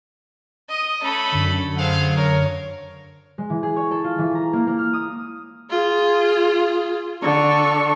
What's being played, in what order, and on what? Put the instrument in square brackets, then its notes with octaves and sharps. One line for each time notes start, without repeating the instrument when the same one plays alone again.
[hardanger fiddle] D#5 D#6
[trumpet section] A3 B5 [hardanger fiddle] C#4 A4
[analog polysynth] F#2 D3
[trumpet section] A3 G#4 F5 [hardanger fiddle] C5 F#5
[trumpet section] A#4 [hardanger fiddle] C#5
[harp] G#3
E3
G#4
C#5
A4
F4
E3
A#5
A#3
A#3
F6
D#6
[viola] F4 G#4
D3 C#6